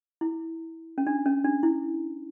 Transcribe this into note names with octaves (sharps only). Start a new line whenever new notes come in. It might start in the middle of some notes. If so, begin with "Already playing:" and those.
E4
C#4
D4
C#4
D4
E4